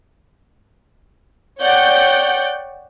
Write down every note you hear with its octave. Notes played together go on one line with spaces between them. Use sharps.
C#5 D5 F#5 G5 G6